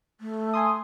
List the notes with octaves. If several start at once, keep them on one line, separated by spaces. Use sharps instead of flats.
A3
G#5 C6 D#6